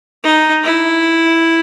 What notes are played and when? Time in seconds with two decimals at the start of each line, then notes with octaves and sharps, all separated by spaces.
0.24 D#4
0.64 E4